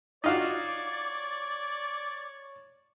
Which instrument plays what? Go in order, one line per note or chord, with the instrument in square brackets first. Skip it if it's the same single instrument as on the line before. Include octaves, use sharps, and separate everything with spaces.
[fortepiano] D#4 F4 F#4 [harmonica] C#5 [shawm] D5